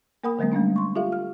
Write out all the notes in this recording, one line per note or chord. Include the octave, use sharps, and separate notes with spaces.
A#3 A#4 F#5 B5 D#6
D3 F#3 G#3 A#3 C4
G3 A3 C#4 D4
C6 C#6
F4 G4 A4 E5 F5
F6